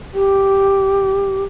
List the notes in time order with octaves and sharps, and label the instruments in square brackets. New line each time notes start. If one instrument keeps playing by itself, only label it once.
[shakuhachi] G4